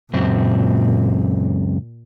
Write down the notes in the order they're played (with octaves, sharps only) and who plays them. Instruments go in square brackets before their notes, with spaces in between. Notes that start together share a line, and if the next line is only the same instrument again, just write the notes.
[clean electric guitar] C#2 F#2 C4 [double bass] A#2